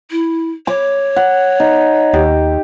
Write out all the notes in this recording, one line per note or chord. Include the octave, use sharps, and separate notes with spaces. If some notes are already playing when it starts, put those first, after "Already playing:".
E4
C#5 D6
F#5
D#4
D#2 G4